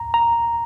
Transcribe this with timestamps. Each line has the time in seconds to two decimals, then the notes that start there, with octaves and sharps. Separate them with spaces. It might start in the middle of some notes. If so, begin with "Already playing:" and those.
Already playing: A#5
0.14 A#5